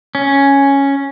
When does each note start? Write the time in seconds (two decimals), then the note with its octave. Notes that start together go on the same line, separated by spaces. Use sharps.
0.15 C#4